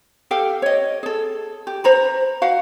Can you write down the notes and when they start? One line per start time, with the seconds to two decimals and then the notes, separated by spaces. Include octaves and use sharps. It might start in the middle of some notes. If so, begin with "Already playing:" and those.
0.31 G4 A4 F5 G5
0.62 C#5 D#5
1.03 G#4 A4
1.67 G4
1.84 C5 A#5 B5
2.42 F#4 F5 F#5